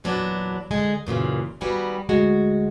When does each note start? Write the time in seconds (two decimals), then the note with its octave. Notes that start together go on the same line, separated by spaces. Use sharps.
0.04 E2 A#2 F#3 B3 D4
0.71 D3 G#3 G#4
1.07 F#2 A#2 C#3 E3
1.61 D#3 G3 B3 F#4 G#5
2.09 D2 G#3 F#4